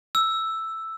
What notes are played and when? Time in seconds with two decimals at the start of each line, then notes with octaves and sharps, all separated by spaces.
0.15 E6